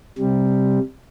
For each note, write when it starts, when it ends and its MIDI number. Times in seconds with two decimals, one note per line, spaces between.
0.19 0.79 48
0.19 0.79 55